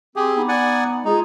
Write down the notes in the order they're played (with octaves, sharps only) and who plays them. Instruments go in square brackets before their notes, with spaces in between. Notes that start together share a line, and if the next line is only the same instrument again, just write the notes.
[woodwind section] C4 [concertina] G4 G#4
[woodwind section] B3 D#4
[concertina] D5 F#5 G#5
[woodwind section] G#3 F4 G#4 [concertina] D#4